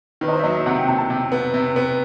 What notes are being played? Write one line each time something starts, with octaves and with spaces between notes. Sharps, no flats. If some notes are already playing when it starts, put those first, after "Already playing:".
D#3 B4
D#5
C5
E5
F#3 D#5
E5
C3 F#5
G5
C3 A5
A5
C3 G5
B3 F#5
C3
B3